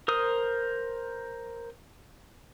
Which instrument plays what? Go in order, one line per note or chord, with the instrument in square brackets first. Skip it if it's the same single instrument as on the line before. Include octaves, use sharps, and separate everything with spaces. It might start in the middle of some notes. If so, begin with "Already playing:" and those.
[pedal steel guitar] A#4 C5 D#6